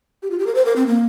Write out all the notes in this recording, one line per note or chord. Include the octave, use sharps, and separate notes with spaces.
G4
F4
G4
A#4
C5
A#4
C4
A#3